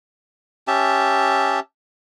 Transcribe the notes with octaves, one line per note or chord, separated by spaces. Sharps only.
C#4 G4 E5 A5